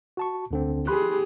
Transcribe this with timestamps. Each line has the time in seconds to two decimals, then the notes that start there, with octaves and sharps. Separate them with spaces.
0.17 F#4 A5 C#6
0.51 D2 D3 C4
0.87 G4 G#4 B5 C6 F#6